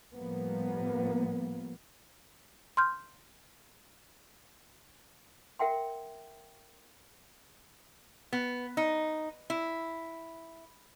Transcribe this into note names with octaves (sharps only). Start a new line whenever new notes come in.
A2 F3 G3 A#3 B3
C6 F6 G6
A#4 E5 F#5 G5 C6
B3
D#4
E4